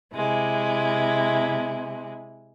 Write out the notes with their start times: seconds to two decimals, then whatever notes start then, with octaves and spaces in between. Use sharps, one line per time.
0.13 C3 G#3 E4